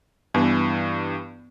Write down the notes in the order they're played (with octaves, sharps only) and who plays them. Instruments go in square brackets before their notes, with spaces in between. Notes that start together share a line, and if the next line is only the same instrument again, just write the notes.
[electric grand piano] G2 E3 [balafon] B3